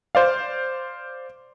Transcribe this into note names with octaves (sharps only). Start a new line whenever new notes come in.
C5 D5 F5